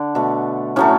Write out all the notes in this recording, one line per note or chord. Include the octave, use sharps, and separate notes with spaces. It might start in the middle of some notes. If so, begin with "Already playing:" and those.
Already playing: D3
B2 A3
A2 F#3 A3 C#4